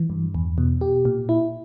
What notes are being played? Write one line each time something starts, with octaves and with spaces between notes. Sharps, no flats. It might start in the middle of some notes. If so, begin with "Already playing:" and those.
Already playing: E3
G2
E2
B2
G4
A#2
E4